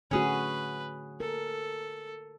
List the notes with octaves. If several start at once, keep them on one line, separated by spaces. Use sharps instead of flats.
D3 A3 C#4 F#4 G#4 B4
A4 A#4